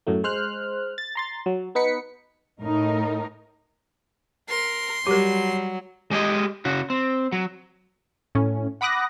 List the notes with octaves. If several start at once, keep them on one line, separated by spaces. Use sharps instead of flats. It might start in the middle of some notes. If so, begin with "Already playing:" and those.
F#2 A2 F#3 A3
G#3 C5 F6 F#6
A6
A#5 C6 A6
F#3
B3 D#4 B4 B6 C#7
A2 D#4 A#4
A#4 C6
F#3 G3 G4 A#4
G#3 G4 G#4 D#5
C#3 F#4
C4
F#3
A2 C#4
F#5 B5 D6 D#6 F#6 A#6